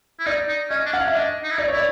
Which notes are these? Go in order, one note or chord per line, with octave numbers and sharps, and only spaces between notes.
E4
D#4 D5
D#4
C#4 D#5
D4
C#4 F#5
F5
C#4 E5
D4 D#5
D#4
E4
D#4 D5
C#5
E4 D5